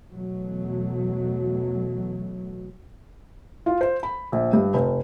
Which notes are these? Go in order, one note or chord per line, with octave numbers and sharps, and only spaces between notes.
E2 B2 F#3 A3
F4
C5
B5
A#1
G2
F1